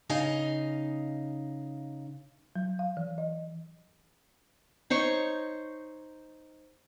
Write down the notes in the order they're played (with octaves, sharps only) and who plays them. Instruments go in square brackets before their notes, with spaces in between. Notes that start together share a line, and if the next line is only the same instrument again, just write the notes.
[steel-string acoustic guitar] C#3 D#4 D#5 F5 G#5
[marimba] F#3
F5
E3
D#5
[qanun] D#4 C5 C#5 C#6